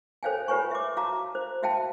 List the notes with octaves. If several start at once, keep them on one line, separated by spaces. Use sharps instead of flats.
A4 C5 C#5 F5 G5 G#5
F4 G4 B4 C#5 G#5 C#6
E5 D6
F#4 F5 A5 A#5 D6
C5
F#4 E5 F5 G5 A5